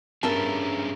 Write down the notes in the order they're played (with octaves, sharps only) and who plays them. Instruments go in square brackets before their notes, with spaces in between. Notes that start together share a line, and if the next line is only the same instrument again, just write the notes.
[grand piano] G2 G7 [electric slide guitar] B3 C#4 G#4 [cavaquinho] A#4 E5 A5